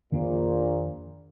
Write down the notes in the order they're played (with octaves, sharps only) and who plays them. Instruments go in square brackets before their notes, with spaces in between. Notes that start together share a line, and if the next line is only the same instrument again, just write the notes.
[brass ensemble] A#1 A#2 [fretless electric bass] F2 D#3 A#3 D4